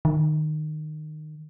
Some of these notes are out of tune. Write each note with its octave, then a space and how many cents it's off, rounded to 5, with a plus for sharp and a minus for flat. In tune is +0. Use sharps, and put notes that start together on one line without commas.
D#3 -20